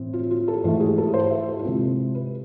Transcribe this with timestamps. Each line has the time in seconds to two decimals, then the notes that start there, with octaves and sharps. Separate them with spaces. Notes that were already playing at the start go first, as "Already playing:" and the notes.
Already playing: A2 E3 C4
0.13 F4
0.31 F4
0.48 A4
0.64 G#2 E3 A3 F4
0.80 G#4
0.98 A4
1.14 C5
1.30 E5
1.48 A4
1.59 E4
1.64 C3 G#3 C4 F4
2.15 B4